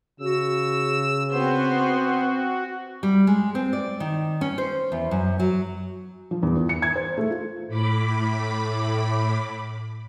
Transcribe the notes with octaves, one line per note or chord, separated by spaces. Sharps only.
C#3 F#4 E6
B3 C4 F#4 C5
G3
G#3
C4
D5
D#3
C#4
C5
E2
F#2
F#3
F3
E2
E2
C#7
G#6
C5
A3
F4
A2 B5 D6